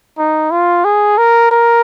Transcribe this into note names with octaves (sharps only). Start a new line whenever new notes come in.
D#4
F4
G#4
A#4
A#4